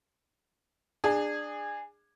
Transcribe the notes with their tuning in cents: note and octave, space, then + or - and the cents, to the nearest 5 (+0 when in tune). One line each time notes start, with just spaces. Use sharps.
D4 +20 G#4 -15